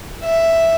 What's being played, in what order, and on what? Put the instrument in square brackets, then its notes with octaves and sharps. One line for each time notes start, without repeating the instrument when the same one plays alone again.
[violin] E5